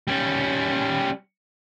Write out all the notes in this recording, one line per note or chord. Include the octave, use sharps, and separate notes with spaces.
G3 C#4